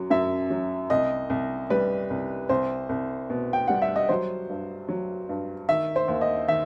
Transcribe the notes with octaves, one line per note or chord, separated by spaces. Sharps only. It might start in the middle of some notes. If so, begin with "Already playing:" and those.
Already playing: F#2 F#3
F#2 E5
F#3
C2 D#5
C2
G3 B4
C2
C2 C5
C2
B2
G5
G3 F#5
E5
D#5
F#3 C5
G2
F#3
G2
D#3 E5
C5
D#2
D#5
D#3 E5